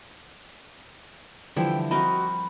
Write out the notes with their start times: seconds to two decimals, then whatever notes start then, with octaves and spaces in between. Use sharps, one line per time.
1.56 D3 E3 F3 G3 E4 G5
1.91 C4 F#4 A#4 D#5 B5